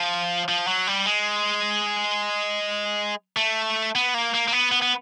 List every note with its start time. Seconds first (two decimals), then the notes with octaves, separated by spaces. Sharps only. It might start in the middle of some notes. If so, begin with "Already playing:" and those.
Already playing: F3
0.49 F3
0.67 F#3
0.87 G3
1.06 G#3
3.37 A3
3.95 B3
4.14 A#3
4.34 A#3
4.48 A#3
4.53 B3
4.72 B3
4.82 B3